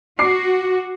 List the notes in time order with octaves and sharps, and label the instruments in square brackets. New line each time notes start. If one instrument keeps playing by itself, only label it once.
[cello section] F#4 [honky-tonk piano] D6 C7